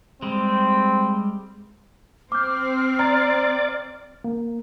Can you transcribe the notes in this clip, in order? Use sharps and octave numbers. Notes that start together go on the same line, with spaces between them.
G3 G#3 C4
C4 D6 F6 G6
D5 A#5
A#3